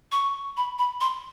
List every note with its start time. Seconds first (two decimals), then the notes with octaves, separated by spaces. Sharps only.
0.12 C#6
0.57 B5
0.79 B5
1.01 C6